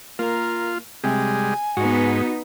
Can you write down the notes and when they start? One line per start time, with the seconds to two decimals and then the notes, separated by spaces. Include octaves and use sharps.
0.19 A#3 F4 A#4
1.04 C3 G3 G#3 G#5
1.77 G#2 B3 D#4 F#4